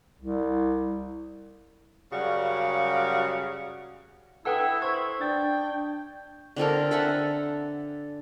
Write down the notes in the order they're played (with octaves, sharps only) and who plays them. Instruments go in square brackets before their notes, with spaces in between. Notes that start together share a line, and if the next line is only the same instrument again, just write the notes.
[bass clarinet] C2
[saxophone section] F#2 C#3 G3 F#4 F5
[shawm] E4 [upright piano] A4 G5 D#6 [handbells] B4 F#5 E6
[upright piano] C5 [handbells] C#6 G#6
[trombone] D4 [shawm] G5 [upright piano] A6
[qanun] D3 C4 A4 A#4
A4 E5 F#5 G#5